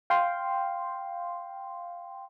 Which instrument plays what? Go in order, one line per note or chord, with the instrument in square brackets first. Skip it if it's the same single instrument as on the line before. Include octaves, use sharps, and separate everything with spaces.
[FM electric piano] F5 G5 C6